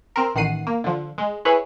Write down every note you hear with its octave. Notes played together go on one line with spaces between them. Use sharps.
C4 A#4
A1 D#3 F#5 C7 D#7
A#3
D3 F3
G#3
E4 G#4 B4 C#5